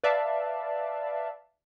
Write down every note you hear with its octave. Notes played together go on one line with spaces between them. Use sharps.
B4 D5 E5 F5 A5